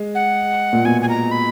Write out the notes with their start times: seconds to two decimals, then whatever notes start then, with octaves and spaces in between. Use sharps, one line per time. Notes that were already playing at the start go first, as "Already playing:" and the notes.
Already playing: G#3
0.15 F#5
0.73 A#2
0.85 B2 G#5
1.02 G#5
1.09 A#5
1.31 B5